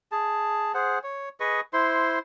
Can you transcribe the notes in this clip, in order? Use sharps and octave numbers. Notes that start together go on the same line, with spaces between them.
G#4 A5
G#4 C5 F#5
C#5
G#4 B4 D#5 C#6
E4 C5 C6